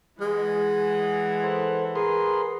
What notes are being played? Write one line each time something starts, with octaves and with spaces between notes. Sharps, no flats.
E3 G#3 F#5
A4 C5
G#4 A#4 B4 C6